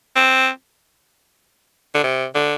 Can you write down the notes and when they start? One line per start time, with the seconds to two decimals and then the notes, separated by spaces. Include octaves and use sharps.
0.16 C4
1.95 D3
2.04 C3
2.35 D3